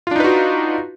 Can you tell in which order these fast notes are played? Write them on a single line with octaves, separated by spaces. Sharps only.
F4 D4 D#4 B4 F#4